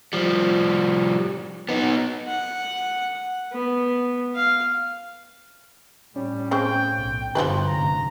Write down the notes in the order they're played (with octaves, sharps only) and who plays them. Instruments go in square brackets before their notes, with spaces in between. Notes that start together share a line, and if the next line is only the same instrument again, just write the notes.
[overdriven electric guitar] F3 G3
B3 D#4
[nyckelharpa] F#5
B3
F5
[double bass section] A2 [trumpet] G3 [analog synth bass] C#4
[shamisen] C#3 C4 [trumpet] G5
[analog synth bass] B1
[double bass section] G1 [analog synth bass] D3 [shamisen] F3 G4 B4
[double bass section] F1 G#2 C#3 [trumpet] A#5